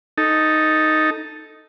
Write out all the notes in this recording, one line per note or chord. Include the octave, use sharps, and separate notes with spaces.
D#4 A4